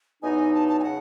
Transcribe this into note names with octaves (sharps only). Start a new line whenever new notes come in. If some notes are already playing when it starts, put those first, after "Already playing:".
E2 B2 F#3 B3 D#4 G#5
A5
A5
G#5
C#3 F#5